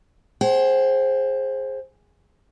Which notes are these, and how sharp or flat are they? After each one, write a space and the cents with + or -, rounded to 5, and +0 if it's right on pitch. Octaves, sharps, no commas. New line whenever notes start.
G#4 +0 C5 +15 G5 -45